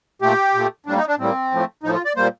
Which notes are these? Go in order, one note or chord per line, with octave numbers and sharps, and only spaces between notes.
A#2 A3 G4
A#2 A3
A2 G3 A#3 D4
D#4
D4
A2 G3 A#3 C4
A2 F3 A3
A2 F3 A3 D#4
F4
D5
A#2 G3 A#3 C5